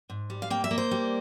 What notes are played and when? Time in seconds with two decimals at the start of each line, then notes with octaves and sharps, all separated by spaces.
0.10 G#2
0.30 G3
0.42 F5
0.50 A#3 G5
0.64 E5
0.71 A#3
0.78 C5
0.91 G3